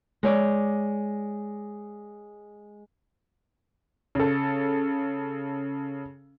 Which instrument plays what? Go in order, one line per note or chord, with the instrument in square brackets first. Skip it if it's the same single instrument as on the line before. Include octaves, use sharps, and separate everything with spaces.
[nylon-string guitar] G#3 C#5 D5
[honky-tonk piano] C#3 A4